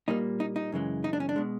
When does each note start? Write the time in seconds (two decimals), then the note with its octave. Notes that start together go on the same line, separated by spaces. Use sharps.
0.08 A#2 G3 A#3 D#4
0.40 D#4
0.56 D#4
0.72 F#2 C#3 E3 G#3
1.04 D#4
1.13 D4
1.20 C#4
1.29 D4
1.36 B2 G#3